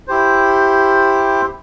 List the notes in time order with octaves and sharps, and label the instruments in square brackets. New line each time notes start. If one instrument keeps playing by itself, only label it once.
[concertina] E4 G4 C5